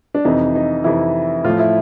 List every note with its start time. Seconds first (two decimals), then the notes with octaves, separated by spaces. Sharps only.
0.14 D4
0.25 F2 C3 E3 D#4
0.55 D#4
0.84 F2 C3 E3 E4
1.44 A2 F3 F4
1.59 E4